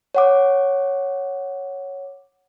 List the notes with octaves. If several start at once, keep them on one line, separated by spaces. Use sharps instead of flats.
C#5 F#5 D6